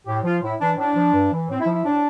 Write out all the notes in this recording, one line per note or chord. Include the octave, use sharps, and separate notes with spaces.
A2 G4
F3 F4
A2 E4
E3 D4
A2 D4
F3
G2
E3
A2 C4
E4
F3
E4
A2 D4